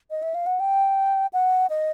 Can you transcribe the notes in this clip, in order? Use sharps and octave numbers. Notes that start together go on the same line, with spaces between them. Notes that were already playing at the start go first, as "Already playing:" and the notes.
D#5
E5
F5
F#5
G5
F#5
D#5